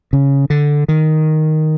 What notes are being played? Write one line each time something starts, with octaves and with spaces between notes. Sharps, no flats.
C#3
D3
D#3